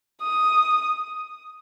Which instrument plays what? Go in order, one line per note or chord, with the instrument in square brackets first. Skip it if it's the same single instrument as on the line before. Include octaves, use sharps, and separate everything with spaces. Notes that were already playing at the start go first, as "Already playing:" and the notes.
[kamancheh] D#6